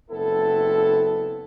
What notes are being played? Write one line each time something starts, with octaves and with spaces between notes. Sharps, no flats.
F#1 B3 C4 E4 A4